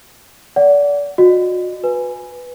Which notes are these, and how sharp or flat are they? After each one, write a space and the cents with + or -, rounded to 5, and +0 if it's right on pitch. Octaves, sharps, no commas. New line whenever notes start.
D5 -30 F#5 +0
F#4 -35 D#5 -25
B4 +0 G#5 +0